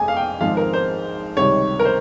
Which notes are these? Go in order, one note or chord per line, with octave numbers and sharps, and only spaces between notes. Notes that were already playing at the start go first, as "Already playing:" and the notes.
Already playing: F1 F2 G#3 G#5 D#6
F5
G5
G#1 G#2 F3 G#3 C4 F5
A#4
C5
C#2 C3 D#3 G3 C#5
A#4
C5